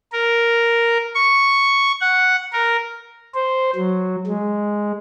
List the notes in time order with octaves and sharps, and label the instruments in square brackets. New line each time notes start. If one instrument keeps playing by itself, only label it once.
[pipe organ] A#4
C#6
F#5
A#4
C5
F#3
G#3